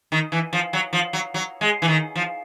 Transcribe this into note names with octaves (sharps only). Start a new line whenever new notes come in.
D#3
E3
F3
F#3
F3
F#3
F#3
G#3
E3
D#3
F3